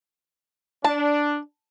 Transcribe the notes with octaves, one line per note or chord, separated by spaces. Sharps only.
D4 A5